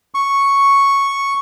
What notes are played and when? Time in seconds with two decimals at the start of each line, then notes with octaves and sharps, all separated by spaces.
0.14 C#6